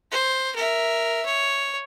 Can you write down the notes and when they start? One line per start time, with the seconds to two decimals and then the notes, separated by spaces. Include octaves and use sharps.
0.11 C5
0.56 A#4 E5
1.26 C#5